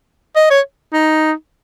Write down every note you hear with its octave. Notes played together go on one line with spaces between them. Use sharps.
D#5
C#5
D#4